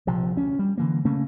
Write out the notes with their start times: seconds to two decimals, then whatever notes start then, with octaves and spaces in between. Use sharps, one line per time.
0.07 A#1 C3 F3
0.36 D2 C#4
0.59 G3
0.78 D3 E3 A#3
1.05 C#3 A3 A#3 C#4